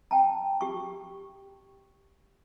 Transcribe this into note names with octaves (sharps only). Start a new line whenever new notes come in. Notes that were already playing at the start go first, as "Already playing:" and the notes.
G5 A5 A#5
G4 C#6